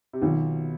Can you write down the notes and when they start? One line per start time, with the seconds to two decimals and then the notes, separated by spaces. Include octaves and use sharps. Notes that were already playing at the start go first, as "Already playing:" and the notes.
0.13 C3
0.22 B1 B2 D#3 B3 F4